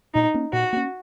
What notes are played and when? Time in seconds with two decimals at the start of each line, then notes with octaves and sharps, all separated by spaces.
0.14 A#2 D#4
0.34 A#3 C#4
0.53 A#2 F#4
0.73 A#3 C#4